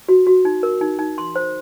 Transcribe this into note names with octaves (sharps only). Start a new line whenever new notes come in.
F#4
F#4
D#4
A#4
D#4
D#4
C6
C5